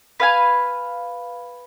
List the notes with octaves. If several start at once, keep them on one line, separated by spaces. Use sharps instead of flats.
B4 F5 G#5